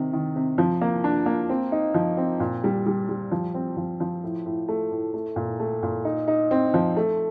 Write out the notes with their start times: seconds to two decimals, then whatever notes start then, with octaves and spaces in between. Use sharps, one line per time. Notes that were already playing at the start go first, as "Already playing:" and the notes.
Already playing: C3 D#3
0.13 D#3
0.36 C3
0.58 F3
0.81 A#3
1.04 D4
1.26 A#3
1.50 C4
1.72 D#4
1.94 F3
2.17 C4
2.40 A#2
2.64 G3
2.86 G3
3.09 G3
3.31 F3
3.54 C4
3.77 F3
4.00 F3
4.23 A2
4.46 A2
4.68 A3
4.92 A2
5.14 A3
5.36 A#2
5.60 A3
5.83 A#2
6.05 D#4
6.28 D#4
6.51 C4
6.74 F3
6.97 A3